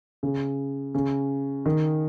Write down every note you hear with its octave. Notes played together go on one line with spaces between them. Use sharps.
C#3
C#3
D#3